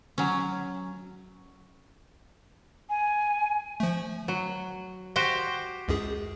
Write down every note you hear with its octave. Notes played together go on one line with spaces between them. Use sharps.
F#3 C#4
G#5
F3 A3
F#3
F#4 G4 C5 A#6
C#2 F#2 G#4